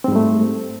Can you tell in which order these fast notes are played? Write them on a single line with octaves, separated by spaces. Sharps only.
C4 G#2 G3 A3